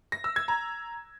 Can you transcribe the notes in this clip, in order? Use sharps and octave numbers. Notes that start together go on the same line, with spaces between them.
A#6
E6
G#6
A#5